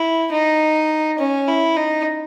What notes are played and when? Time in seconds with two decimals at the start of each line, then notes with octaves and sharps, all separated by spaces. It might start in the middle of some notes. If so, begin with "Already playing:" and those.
Already playing: E4
0.32 D#4
1.19 C#4
1.48 E4
1.77 D#4